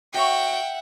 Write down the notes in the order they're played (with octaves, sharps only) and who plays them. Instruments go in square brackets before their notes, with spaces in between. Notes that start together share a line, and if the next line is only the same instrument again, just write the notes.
[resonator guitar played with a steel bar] F#4 C#5 [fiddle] E5 F#5 [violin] G5